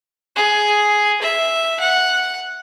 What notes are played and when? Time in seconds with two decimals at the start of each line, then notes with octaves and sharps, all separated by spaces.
0.36 G#4
1.21 E5
1.80 F#5